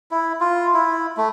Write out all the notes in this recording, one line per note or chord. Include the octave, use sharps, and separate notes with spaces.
E4
F4
E4
A3